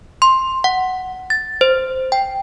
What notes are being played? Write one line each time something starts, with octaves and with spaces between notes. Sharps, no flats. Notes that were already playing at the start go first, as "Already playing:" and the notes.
C6
F#5
A6
C5
G5